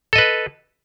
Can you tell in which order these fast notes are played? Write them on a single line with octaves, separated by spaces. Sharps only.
A4 D#5 B4